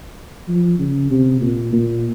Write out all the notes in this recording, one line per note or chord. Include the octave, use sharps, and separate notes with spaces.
F3
C#3
C3
A#2
A#2